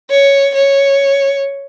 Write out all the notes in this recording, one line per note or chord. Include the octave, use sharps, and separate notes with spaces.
C#5
C#5